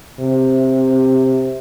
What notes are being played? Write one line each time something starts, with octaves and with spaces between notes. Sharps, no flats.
C3